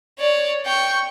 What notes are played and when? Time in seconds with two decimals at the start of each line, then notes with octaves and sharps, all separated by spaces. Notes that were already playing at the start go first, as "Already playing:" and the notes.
0.19 C#5 D5
0.66 G5 C#6